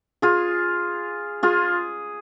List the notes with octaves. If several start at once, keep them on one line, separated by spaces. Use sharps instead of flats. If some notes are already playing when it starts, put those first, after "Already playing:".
F4 G#4
F4 G#4